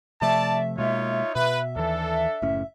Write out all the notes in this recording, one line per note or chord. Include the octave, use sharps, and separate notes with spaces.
C3 F3 A3 D5 E5 A5
B2 G#3 A#3 D#4 F4 C#5
B2 B4
D#2 E3 D4 A4
F#1 A2 C#4